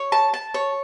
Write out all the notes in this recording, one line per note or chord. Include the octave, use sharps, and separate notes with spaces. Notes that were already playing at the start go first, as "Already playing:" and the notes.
Already playing: C#5
A5
A5
C#5